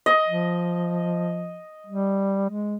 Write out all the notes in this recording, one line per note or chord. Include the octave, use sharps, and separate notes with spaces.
D#5
F3
G3
G#3